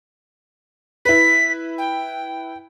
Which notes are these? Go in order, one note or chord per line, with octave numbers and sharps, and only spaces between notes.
E4 B4 B6
G5